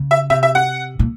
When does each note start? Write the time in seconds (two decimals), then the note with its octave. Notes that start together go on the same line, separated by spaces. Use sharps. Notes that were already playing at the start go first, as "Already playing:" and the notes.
Already playing: C#3
0.11 E5
0.30 C3 E5
0.43 E5
0.55 F#5
0.99 A#2